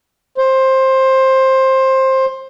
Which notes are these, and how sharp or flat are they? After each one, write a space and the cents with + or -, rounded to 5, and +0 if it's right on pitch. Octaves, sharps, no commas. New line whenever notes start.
C5 +15